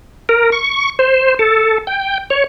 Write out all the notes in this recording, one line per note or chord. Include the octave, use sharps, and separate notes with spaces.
A#4
C#6
C5
A4
G5
C#5